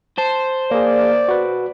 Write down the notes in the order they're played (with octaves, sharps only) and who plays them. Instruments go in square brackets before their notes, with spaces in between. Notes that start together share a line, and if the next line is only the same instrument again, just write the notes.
[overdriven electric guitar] C5 [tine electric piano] A5
[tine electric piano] A#3 G#4 [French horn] D5
[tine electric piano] F#4 B4